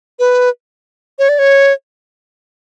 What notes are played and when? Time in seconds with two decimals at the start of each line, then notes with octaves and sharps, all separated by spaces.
0.19 B4
1.19 C#5
1.29 D5
1.39 C#5